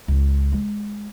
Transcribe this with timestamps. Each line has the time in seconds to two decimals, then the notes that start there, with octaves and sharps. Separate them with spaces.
0.08 C#2
0.52 G#3